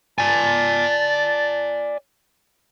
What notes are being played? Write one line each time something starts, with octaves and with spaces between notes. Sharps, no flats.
D5 G#5 A5